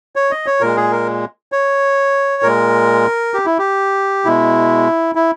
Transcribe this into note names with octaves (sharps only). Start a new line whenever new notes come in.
C#5
D#5
C#5
A#2 G#3 A#4
G#4
A#4
C#5
A#2 G#3 A#4
G4
E4
G4
B2 G#3 E4
E4